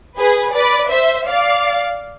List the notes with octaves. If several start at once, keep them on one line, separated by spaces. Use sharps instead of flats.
G#4 B4
B4 D5
C5 E5
D5 F5